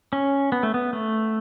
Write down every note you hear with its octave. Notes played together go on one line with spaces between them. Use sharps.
C#4
B3
A3
B3
A3